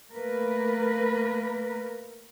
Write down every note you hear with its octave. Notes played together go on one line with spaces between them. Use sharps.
A3 A#3 A#4 B4